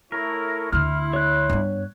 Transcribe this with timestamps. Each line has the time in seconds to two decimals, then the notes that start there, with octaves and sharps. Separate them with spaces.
0.12 A3 E4 A#4 C#5
0.72 D2 D3 E4 C6 F6
1.13 C#5 F#6
1.49 G2 B3